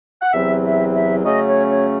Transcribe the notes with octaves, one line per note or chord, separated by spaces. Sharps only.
F#5
E2 C3 F#3 C4 E4 E5
E5
E5
C#3 F#3 A3 C#4 D#5
C#5
C#5